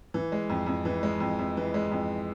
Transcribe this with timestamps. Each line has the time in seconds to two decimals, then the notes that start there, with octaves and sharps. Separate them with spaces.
0.14 E3
0.32 G#3
0.50 F2
0.67 F2
0.85 E3
1.03 G#3
1.20 F2
1.39 F2
1.57 E3
1.74 G#3
1.92 F2